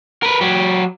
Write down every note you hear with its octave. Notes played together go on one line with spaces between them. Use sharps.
A#4 B4
F#3 G4